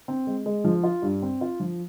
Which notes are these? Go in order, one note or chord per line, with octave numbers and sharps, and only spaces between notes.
C4
G#3
G#3
F3
F4
G2
C4
F4
F3